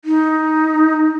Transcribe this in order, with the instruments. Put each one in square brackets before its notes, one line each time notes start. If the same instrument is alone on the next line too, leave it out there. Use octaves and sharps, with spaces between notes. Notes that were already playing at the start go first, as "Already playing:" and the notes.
[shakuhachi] D#4